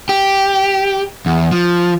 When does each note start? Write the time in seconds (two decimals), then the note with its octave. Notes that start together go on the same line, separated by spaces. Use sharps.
0.09 G4
1.26 E2
1.51 F3